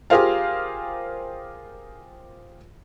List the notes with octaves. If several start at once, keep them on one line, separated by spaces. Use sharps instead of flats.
F4 G4 G#4 A#4 C5 F5